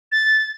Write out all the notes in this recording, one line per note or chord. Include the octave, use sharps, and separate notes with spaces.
A6